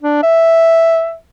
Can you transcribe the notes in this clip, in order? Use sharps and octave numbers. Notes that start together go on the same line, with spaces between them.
D4
E5